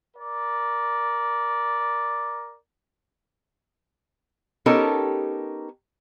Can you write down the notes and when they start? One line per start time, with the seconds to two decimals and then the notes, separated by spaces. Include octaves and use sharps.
0.17 A#4 D5
4.66 B3 C#4 D#4 G4 A4 A#4